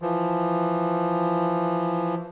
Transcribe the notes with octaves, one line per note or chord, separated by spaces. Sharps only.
E3 F3